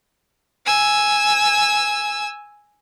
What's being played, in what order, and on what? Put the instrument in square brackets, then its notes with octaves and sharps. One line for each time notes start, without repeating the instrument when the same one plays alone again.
[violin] G#5 E6